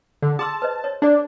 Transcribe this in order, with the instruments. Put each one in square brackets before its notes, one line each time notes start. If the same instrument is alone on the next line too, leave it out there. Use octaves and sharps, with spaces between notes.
[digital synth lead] D3
[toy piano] G#4 C6 E6 [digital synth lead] A5
[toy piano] B4 C5 D#5
C#5
[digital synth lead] D4 [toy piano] G#4 D5